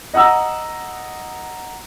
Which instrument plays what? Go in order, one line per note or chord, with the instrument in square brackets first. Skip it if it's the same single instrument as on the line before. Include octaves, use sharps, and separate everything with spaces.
[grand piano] D#5 F#5 A#5 E6